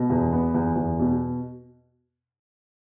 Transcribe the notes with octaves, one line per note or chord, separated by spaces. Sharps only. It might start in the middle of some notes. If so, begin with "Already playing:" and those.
Already playing: B2
E2
B3
E2
E2
B2